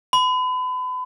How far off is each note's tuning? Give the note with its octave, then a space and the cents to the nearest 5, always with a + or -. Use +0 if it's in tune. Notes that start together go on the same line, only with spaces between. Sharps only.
B5 +35